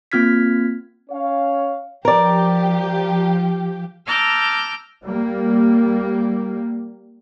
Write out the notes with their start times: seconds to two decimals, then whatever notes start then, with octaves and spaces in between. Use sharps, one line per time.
0.12 A#3 C4 F4 F6 G#6 B6
1.10 C#4 C#5 F5
2.05 F3 G4 A#4 D5
4.06 A5 A#5 D6 E6 F6 G6
5.04 G3 A#3